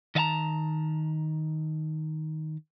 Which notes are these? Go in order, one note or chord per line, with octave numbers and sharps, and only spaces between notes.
D#3 D#5 F5 A5 A#5